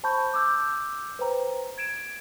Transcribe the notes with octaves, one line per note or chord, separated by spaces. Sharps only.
C5 A5 B5 C#6 G6
D6 E6 G6
B4 C5 G5 A#5
G#6 D7 E7